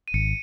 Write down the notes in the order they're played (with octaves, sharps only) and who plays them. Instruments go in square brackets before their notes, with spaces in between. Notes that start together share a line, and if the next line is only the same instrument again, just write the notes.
[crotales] D#7
[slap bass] G#1 [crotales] C#7